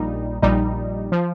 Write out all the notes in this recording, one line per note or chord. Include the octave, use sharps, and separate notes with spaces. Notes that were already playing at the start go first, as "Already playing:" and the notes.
Already playing: A#1 A#2 G3 D#4
A#1 A#2 G3 D#4
F3